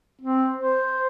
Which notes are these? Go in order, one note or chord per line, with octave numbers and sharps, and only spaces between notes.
C4
C5